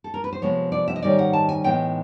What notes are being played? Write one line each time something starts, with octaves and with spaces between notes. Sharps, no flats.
A4
A#4
B4
C5
C3 F3 G#3 B3 C#5
D5
E5
D#5
G#2 D#3 G3 A#3 C#4 D5
F#5
A5
G#5
A2 E3 G#3 B3 D#4 G5